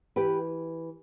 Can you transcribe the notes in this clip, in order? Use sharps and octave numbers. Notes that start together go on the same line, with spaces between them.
E3 G4 B4